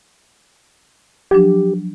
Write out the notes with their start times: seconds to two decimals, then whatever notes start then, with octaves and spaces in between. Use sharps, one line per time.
1.31 F3 F#3 D4 G4